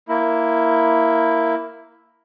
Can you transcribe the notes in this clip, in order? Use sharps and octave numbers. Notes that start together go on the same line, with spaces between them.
A#3 E4